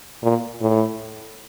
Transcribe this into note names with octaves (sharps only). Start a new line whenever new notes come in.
A#2
A2